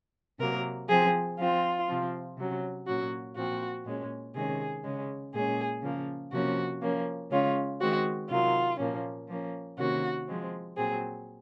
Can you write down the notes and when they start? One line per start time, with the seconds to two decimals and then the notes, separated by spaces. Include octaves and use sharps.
0.40 C3 F#3 A#3 A#4
0.89 F3 C4 G#4
1.38 F3 C4 F4
1.88 C3 F3 C4
2.37 C3 F#3 C#4
2.87 A#2 F#3 C#4 F#4
3.36 A#2 F3 C4 F#4
3.85 A#2 G#3 C#4
4.35 C3 D#3 G#3 C#4 G#4
4.84 C#3 G#3 C#4
5.34 A#2 G#3 C#4 G#4
5.83 C#3 F3 A#3
6.32 C3 F3 A#3 C#4 F#4
6.81 F3 A#3 C#4
7.31 C#3 G#3 C#4 F4
7.80 D#3 G#3 C4 F#4
8.30 C3 D#3 F#3 F4
8.79 A#2 F3 A#3 C#4
9.29 F3 A#3 C#4
9.78 C3 D#3 A#3 C#4 F#4
10.27 F3 G#3 C4
10.77 A#2 F#3 C4 G#4